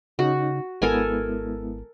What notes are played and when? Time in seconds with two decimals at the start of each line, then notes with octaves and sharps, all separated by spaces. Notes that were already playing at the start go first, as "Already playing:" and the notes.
0.19 C#3 C#4 D#4 F#4
0.82 G#1 G#3 B3 E4 A4 A#4 G#5